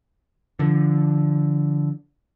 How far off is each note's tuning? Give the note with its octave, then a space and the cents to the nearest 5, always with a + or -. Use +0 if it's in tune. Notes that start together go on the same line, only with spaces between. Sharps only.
D3 -10 F3 -35